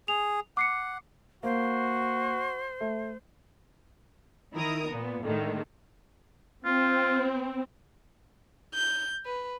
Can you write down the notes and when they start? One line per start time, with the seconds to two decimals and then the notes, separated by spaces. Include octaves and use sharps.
0.08 G#4 F7
0.57 F#5 D6 C7 C#7
1.43 A#3 F#4 C5
2.81 A3
4.53 D#3 E4 A#4 A#5 D#6
4.88 A#2 B3
5.24 A2 D3 D#3 G#3 A3
6.65 C4 F4
8.75 G6
9.26 B4